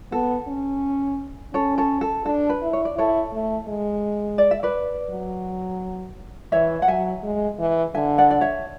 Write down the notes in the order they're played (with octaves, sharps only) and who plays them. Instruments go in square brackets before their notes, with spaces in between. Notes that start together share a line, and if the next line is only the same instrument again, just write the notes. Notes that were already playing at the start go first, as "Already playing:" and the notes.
[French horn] B3 [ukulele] A4
[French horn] C#4
[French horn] C#4 [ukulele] A4 C#5
[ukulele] A4 C#5
A4
[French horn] D4 [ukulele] A4
[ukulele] B4
[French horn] E4
[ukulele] C#5
D5
[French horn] E4 [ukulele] A4 C#5
[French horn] A3
G#3
[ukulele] D5
E5
B4 D5
[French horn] F#3
[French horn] E3 [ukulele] C#5 E5
[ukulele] F#5
[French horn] F#3 [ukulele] E5 G#5
[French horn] G#3
E3
[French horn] D3 [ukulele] E5 G#5
[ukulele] D5 F#5
D5
C#5 E5